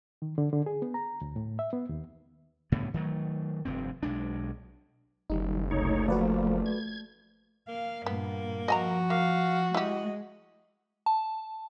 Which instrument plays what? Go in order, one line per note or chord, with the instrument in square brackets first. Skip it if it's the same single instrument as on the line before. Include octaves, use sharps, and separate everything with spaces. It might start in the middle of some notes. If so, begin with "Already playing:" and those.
[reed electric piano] D#3
D3
D3
G#4
B3
A#5
D2
A2
E5
B3
D#2
[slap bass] C2 A2 D3 B3
D#3 F#3 A3
F1 G2 C4
B1 G#3 D4
[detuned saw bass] F#1 [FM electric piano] D#3 G3 D#4
[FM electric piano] C#2 C3 [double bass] A3 [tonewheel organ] D#4 C#5
[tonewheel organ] F3 A#3 [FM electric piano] F#4 B4 D5
[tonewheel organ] G#6
[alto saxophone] A#3 [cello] F5
[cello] G2 A#2 [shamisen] B3
[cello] F3 [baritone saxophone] F#4 [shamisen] D#5 G#5 A#5
[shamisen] A#3 [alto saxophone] F5
[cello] G#3 [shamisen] E4 G4 [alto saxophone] D#5
[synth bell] A5